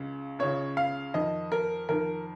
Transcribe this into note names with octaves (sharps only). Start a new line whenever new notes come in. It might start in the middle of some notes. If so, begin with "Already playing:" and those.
Already playing: C#2 C#3
C#2 C#3 C#5
F5
F2 D#3 D#5
A#4
F2 D#3 A#4